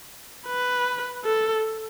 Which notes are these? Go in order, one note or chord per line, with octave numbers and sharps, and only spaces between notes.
B4
A4